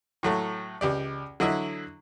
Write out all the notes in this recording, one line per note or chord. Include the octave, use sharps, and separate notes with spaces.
A2 F#3 A3
C#2 G4 D5
D3 F#3 E4 D#5 E5